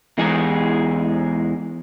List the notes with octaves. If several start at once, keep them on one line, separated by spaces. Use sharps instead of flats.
E2 G#3 D#4 G#4